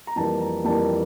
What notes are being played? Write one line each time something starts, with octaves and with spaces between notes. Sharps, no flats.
A#5
F2 E3 G3 A#3 A5
A#5
F2 E3 G3 A#3 A5